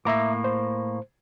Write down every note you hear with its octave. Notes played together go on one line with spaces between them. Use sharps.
A2 A#3 E5 A#5 D6
C5